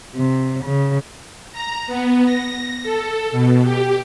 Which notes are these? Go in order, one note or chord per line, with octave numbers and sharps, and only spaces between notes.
C3
C#3
A#5
B3
A#6
A4
B2
G4